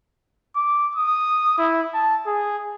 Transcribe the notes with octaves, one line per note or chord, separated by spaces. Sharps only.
D6
D#6
E4
A5
G#4